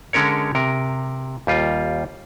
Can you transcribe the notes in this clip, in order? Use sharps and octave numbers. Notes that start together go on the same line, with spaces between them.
D3 G#3 C#4 A#4 C#5
C3 A#4
D#2 G3 F4